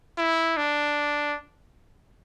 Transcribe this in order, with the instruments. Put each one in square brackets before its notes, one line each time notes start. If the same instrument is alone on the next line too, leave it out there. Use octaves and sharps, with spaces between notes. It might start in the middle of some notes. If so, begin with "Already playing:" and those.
[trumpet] E4
D4